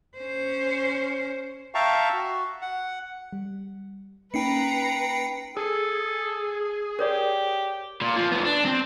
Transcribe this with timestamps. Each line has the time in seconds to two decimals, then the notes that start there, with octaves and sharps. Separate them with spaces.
0.17 C#4 C5
1.75 E5 F5 G5 A5 A#5 C#6
2.13 F#4
2.61 F#5
3.33 G3
4.34 A#3 C#4 D#4 B4 G5 A#5 C7 C#7
5.57 G#4 A4
6.99 G4 A#4 C#5 D5
8.01 A#2
8.16 F3
8.32 D2 B3
8.45 D4
8.65 C4